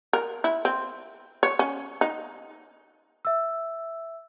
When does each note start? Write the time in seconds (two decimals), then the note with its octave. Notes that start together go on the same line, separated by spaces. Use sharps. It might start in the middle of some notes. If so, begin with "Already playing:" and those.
0.13 A#4
0.44 E4
0.65 C4
1.43 C#5
1.59 C#4
2.01 D#4
3.25 E5 E6